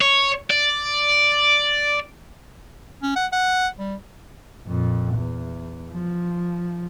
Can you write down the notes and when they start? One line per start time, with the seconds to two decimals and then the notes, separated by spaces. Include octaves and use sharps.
0.01 C#5
0.51 D5
3.03 C#4
3.16 F#5
3.32 F#5
3.79 G3
4.66 F2 A#2
5.14 E2
5.92 F3